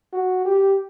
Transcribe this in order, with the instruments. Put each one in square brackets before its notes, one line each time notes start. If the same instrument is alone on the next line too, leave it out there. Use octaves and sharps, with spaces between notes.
[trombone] F#4
G4